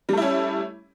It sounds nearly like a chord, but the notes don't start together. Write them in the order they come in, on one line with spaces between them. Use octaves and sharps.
G3 A3 E4 C#4